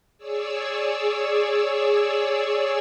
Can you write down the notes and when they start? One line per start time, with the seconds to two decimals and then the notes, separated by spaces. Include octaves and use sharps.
0.18 G#4 C#5 D5 E6